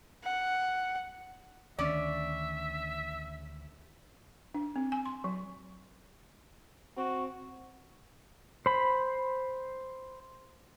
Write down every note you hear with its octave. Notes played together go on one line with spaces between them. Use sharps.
F#5
D2 D#3 C#4 D4 D5 E5
D4
C4
G#5
C6
F#3
C4 F#4
C5 B5